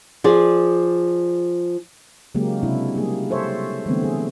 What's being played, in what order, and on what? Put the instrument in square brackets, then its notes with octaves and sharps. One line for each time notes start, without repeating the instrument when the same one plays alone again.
[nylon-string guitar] F3 G#4 D5
[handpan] C#3 F#3 G#3 A#3 G4
C3 D4 E4
G3 A#3 G#4
G4 A4 C5 C#5 E5
D3 E3 G3 A3 B3 C4
G#4